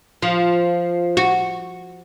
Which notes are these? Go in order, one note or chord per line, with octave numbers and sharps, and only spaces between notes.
F3
F#4